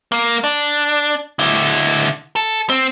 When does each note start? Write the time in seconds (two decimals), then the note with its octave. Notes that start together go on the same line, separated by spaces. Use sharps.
0.12 A#3
0.44 D4
1.39 D3 E4
2.36 A4
2.70 C4